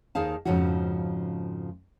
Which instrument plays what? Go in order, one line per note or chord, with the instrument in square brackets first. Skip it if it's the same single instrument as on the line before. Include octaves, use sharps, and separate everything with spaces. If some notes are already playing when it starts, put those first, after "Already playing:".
[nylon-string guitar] D#2 D#3 G#4 C5 F5 A5
F2 G#2 C#3 F3 C#4 F#4